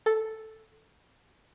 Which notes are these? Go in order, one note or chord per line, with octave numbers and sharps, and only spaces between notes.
A4